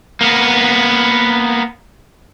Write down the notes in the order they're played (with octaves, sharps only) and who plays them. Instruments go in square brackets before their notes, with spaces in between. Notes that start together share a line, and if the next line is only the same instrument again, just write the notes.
[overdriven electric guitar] A#3 B3